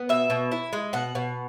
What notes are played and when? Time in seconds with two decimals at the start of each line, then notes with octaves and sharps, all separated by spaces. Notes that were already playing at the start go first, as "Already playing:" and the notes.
Already playing: B3
0.09 B2 E5
0.30 B2
0.52 E4
0.73 G#3
0.93 B2 F#5
1.15 B2